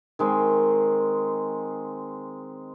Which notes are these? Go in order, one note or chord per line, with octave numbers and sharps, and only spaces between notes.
D#3 G#3 C4